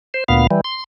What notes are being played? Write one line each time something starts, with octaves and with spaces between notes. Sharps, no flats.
C5
D2 A#2 B3 F5
E3 G3
C6